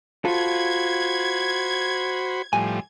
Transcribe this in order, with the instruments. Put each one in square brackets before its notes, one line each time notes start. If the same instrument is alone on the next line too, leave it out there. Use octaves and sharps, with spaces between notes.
[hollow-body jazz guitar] F4 A4 [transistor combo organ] F#4 C5 B5 [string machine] G#6
[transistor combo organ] A2 F3 G3 [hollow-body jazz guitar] G#5